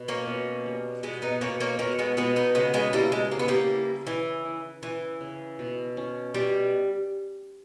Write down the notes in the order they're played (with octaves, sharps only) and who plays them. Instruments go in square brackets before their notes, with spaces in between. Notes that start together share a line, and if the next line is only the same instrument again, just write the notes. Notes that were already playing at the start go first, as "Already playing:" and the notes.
Already playing: [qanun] B2
[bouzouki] A#3 C#4
[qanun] B2
G3
[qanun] B2 [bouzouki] G#3 B3
[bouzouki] B3 D#4
[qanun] B2 [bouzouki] A#3 C#4
[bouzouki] A#3 C#4
[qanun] B2 [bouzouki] A#3 C#4
[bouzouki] G#3 B3
[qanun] B2 [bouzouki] G#3 B3
[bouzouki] B3 D#4
[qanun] C#3 [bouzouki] G#3 B3
[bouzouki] G#3 B3
[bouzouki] G3 A#3 [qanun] E4
[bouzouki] G#3
[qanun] C#3 [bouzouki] A#3
[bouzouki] B3
G3 A#3
[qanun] E4
[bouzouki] E3 [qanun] E4
[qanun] E4
[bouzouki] E3 [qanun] E4
[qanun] C#3
B2
C#4
[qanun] B2 [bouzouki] G3